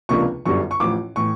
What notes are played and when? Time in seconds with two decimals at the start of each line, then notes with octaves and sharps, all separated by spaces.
0.09 C#2 C3 F3 A#3 D4 C#6
0.45 G1 F#2 D3 G3 C#6
0.71 C#6
0.80 A1 A2 F3 D6
1.16 A2 E3 C#6